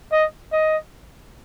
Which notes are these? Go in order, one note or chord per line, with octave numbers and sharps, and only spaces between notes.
D#5
D#5